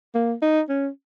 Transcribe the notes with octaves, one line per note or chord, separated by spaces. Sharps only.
A#3
D#4
C#4